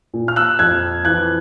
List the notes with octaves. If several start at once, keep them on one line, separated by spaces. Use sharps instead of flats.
A#2
F6
E6 F#6
F2 F#6 G#6
E3 F#6 G#6